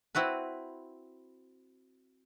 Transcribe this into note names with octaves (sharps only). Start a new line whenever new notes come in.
C4 E4 F#4 B4